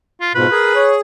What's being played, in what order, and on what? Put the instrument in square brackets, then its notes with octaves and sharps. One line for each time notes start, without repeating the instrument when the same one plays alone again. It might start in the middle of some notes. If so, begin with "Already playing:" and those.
[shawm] F4
[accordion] G#2 B2 [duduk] F4 [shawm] B4
[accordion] G#4 [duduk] A#4
[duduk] C#5